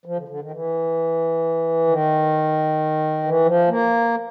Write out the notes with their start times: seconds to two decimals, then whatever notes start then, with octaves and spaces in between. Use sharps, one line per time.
0.06 F3
0.17 D3
0.28 D3
0.40 D#3
0.51 E3
1.87 D#3
3.23 E3
3.45 F3
3.68 A#3